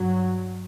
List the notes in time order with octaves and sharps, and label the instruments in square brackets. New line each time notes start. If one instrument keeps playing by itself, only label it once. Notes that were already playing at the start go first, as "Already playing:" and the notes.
Already playing: [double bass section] G2 F#3